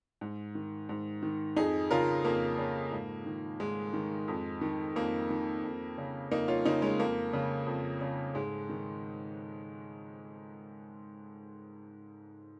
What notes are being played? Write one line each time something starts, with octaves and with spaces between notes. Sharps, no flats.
G#2
D#3
G#2
D#3
F2 D#4 G#4
C#3 F4 A#4
F2 A#3
C#3
G#2
D#3
G#2 G#3
D#3
F2
D#3
F2 A#3
D#3
F2
C#3
F2 A#3 D#4
C#4 F4
C#3 A#3 D#4
G#3 C#4
F2 A#3
C#3
F2
C#3
G#2 G#3
D#3